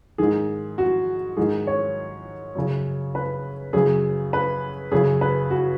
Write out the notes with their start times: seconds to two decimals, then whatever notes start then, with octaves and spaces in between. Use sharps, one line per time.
0.18 G#2 D#3 G#4
0.78 F#4
1.37 G#2 D#3 G#4
1.67 C#5
2.55 F#2 C#3
3.15 B4
3.73 F#2 C#3 G#4
4.33 B4
4.91 F#2 C#3 G#4
5.21 B4
5.50 F#4